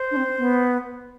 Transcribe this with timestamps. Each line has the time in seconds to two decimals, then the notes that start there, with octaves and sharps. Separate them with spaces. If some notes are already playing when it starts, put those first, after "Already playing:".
Already playing: C5
0.11 D4
0.16 C4
0.38 B3